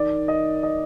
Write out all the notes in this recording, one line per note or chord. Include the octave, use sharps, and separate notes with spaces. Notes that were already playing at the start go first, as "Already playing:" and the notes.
Already playing: D#3 D5
D#5
D#5